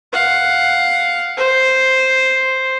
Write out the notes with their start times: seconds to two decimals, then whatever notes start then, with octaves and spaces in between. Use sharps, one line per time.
0.13 F5 F#5
1.37 C5